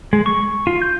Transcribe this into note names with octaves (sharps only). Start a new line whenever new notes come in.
G#3
C#6
F4
G6